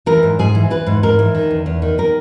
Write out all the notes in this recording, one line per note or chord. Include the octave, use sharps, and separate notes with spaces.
E3 A#4
G#2
G#2 G#4
E3
E3 B4
G#2
G#2 A#4
E3
D#3
E2
E2
D#3
D#3 A#4